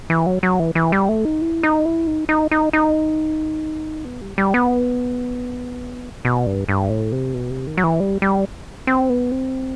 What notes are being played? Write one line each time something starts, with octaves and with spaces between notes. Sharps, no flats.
E3
F#3
F#3
E3
E3
G3
A3
D#4
E4
D#4
E4
D#4
D#4
D#4
D#4
B3
G3
G3
B3
B2
G2
G2
A2
C3
B2
C3
D#3
F#3
E3
G3
G3
C4
B3
C4